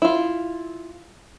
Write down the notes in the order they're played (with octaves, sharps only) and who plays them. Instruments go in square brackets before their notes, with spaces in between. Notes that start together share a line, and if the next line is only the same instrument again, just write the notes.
[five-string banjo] E4 F4